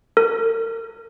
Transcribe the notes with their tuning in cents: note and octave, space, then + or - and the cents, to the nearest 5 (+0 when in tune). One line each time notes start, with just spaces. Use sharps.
A#4 -45